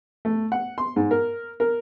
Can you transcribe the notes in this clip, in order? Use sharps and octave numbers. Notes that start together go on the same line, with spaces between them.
A3
F#5
C6
G#2
A#4
A#4